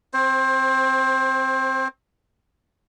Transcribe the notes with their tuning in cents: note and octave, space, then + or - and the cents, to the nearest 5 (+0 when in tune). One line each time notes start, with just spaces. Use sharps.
C4 +0 C5 +25